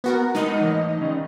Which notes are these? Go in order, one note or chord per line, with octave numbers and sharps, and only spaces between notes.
B3 F#4 A#4
G#3 D#4 A#4 D#5 F#5
E3 C#5
D#3 C#4